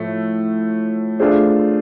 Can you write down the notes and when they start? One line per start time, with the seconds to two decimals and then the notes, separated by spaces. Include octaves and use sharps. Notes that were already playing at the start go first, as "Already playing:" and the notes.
Already playing: A2 F3 A3
1.19 A3 D4 F4 G#4 C5